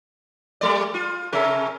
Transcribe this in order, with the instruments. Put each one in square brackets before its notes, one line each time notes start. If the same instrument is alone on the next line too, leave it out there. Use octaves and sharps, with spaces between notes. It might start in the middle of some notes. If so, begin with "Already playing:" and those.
[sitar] G3 G#3 D5
F4
[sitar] C3 C#4 A#4 [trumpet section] A4 E5